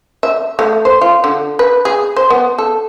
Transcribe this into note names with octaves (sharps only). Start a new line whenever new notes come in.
E5
A3
C5
F4
D3
B4
G#4
C5
B3
A4